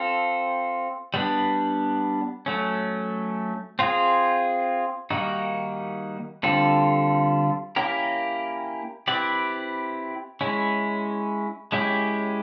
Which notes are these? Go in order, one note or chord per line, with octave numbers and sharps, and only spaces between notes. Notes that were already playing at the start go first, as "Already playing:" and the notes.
Already playing: C4 F4 A4
G3 B3 D4
F#3 A3 C#4
C4 F4 G#4
D#3 G3 A#3 D#4 F#4
D3 G3 C4 F4 A4
A#3 C#4 E4 G4 A#4
C4 E4 G4 B4 D5
G#3 C#4 E4
G#3 C#4 E4 G4